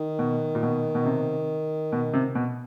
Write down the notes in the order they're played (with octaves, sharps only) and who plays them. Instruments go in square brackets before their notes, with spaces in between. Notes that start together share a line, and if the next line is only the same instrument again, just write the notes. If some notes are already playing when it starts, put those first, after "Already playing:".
Already playing: [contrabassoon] D#3
[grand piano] B2
A#2
B2
B2
C3
B2
C3
B2